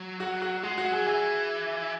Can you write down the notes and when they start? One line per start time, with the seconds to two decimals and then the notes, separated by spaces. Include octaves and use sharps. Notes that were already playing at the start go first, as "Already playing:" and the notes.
Already playing: F#3
0.20 F#4
0.42 F#4
0.63 G#3 F#4
0.78 F#4
0.85 F#3
0.92 G#4
1.06 E3 G#4